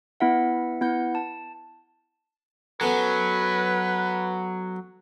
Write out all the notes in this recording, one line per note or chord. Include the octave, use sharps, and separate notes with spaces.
B3 E4 E5 F#5
B3 E4 F#5 G6
A5
F#3 B3 C#4 A4 B4